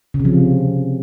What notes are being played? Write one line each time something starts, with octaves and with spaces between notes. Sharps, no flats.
C#3
C3
F3